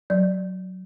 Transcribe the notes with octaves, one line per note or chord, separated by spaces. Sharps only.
F#3 D5